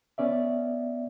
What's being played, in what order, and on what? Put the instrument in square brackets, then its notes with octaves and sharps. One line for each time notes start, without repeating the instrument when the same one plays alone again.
[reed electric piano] B3 C#4 D5 E5